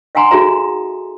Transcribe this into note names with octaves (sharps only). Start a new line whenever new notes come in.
D#5 F5 F#5 G#5 A#5 C6
D#4 F#4 G#4 A4 E5 A#5